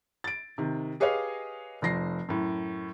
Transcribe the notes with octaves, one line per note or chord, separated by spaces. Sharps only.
A6 D7
C3 D#3
G4 G#4 B4 C#5 D#5 F5
F1 F3 A#6 C7
F#2 A2